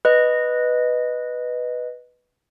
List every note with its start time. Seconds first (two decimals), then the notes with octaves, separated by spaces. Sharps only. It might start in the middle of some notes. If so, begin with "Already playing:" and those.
0.05 B4 D#5